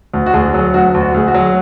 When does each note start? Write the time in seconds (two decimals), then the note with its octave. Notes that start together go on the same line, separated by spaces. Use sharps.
0.14 D2
0.26 F#4
0.33 D2 G#4
0.54 F#3
0.74 D2 F#4
0.94 D2
1.01 F#4
1.14 D2 G#4
1.28 F#4
1.34 F#3